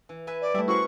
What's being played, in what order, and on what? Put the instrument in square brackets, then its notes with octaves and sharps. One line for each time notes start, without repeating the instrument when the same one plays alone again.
[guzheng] E3
B4 E5 G#5
[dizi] D5
[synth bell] G3 A3 [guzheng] E4 E5
[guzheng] C#4 A#4 [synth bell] E4 F#4 C5 [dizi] C#6